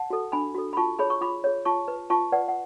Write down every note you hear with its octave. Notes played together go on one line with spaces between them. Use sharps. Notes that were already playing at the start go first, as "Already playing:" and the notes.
Already playing: F#5 A5
F#4 A4
D4 G#5 B5
F#4 A4
B5
F4 A5 C#6
G#4 C#5 B5
C#6
F4 B5 D6
G#4 C#5
F4 A5 C#6
B4
F4 A5 C#6
B4 D5 F#5
F#5